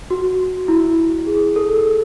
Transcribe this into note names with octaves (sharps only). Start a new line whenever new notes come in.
F#4
E4
G#4
A4